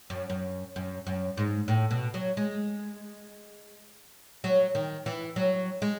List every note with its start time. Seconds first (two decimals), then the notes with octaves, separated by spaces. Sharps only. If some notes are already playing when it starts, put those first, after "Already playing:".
0.10 F#2
0.30 F#2
0.76 F#2
1.07 F#2
1.37 G#2
1.68 A2
1.91 B2
2.14 F#3
2.37 G#3
4.44 F#3
4.75 D#3
5.06 E3
5.36 F#3
5.82 G#3